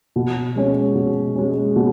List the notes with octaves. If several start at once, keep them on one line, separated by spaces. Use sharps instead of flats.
B2
G#3 C#4
B2
G#3 C#4
B2